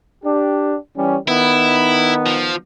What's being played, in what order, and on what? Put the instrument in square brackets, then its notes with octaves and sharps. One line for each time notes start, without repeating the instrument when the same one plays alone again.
[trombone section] D4 G4
E3 G3 C#4
[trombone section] D#3 B3 D#4 [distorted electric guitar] E4
[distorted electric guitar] F3